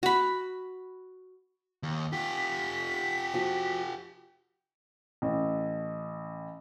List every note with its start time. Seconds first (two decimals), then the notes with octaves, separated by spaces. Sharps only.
0.03 F#4 B5
1.83 D#2
2.13 F4 G4 B6
3.33 F3 F#4
5.22 A1